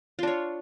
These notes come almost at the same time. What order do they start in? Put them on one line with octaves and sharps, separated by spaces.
F4 D4 C#5